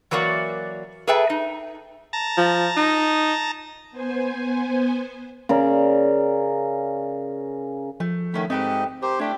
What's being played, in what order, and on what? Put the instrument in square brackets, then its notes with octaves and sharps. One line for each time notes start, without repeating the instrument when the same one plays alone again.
[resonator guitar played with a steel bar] E3 F#3 A#3 F#4 D5
G#4 A4 B4 E5 G5 A5
D#4
[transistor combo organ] A5 A#5
[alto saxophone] F3
D#4
[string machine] B3 C5 G#5
[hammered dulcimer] C#3 A#4 D5
[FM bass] F3 [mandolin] A3
[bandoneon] D#3 A3 [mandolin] B3 C#4 E4
[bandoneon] G#2 D#5 [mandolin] A3 G4 B4 [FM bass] C4
[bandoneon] G4 C5 [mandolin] A#4
[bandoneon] A3 D4 [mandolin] E4 G4 A4